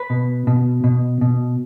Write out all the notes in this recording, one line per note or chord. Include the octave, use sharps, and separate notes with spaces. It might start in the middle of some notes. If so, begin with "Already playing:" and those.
Already playing: B4
B2
B2
B2
B2